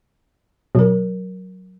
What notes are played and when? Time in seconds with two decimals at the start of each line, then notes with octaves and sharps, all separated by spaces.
0.75 B2 F#3 A#4